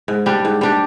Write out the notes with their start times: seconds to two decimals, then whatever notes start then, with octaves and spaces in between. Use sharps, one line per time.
0.08 G#2
0.26 G3 D4 G4
0.45 G#2
0.61 G3 D4 G4